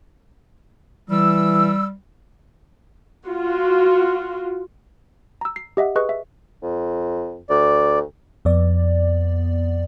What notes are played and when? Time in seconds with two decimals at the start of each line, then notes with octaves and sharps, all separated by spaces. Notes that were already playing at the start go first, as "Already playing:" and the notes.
1.10 E3 G3 E6
3.27 F4 F#4
5.41 A#5 E6
5.56 C7
5.77 G4 D#5 E5 F#5
5.96 G#4 B4 D#5 C#6 F#6
6.09 E5
6.62 F2
7.50 D2 D5
8.45 F2 B3 D5